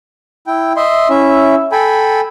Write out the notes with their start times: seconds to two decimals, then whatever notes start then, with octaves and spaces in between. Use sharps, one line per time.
0.47 E4 G5
0.76 D#5 E5 C6
1.09 C#4 E4 E5
1.72 A4 G5 G#5 B5